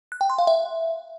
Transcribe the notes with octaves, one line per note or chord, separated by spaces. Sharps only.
F#6
G5
C6
F5
E5